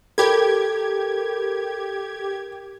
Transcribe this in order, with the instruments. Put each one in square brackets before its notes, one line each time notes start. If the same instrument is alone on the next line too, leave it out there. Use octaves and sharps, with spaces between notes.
[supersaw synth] G4 G#6 [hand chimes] A4 [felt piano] A#4 B5